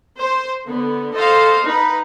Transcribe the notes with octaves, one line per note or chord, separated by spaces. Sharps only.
C5
D3 B3
A4 C5 D#5 F5
D#4 B4